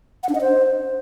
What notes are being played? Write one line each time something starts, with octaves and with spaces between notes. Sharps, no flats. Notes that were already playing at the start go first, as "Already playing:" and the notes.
F#5
D4
D#5
C5